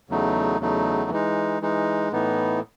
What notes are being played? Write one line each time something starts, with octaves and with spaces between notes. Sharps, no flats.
E2 C#3 F#3 A3 D#4
E2 C#3 F#3 A3 D#4
E3 G#3 D#4
E3 G#3 D#4
A2 E3 B3 D#4